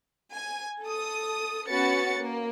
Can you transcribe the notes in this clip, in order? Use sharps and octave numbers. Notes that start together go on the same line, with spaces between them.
G#5
A4 D#6
B3 C#4 F#4 B4 A6 C#7
A#3